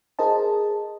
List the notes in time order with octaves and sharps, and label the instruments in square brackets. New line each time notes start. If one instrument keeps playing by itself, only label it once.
[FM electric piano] G#4 A#4 C5 D#5 A5